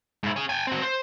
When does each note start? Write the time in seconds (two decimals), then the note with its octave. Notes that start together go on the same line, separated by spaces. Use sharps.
0.23 G#2 E4
0.36 C#4 G#4
0.49 G5 G#5
0.67 C4 F#4
0.82 C5